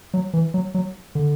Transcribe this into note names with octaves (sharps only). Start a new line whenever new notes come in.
F#3
E3
F#3
F#3
D3